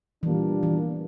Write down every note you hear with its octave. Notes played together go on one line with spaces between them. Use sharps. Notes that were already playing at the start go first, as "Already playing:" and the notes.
A#2 E3 G3 A#3 D4
E3